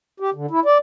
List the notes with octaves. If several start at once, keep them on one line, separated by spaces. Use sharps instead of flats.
G4
D3
E4
D5